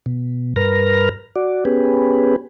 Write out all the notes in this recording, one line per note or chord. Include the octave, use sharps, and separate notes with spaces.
B2
G2 A#4 B4 F6 A#6
F#4 D5
B3 C#4 G4 G#4 B4